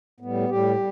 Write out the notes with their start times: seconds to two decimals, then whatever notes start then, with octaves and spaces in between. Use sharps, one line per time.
0.20 A2 G3 B3
0.49 A2 G3 G4
0.76 G3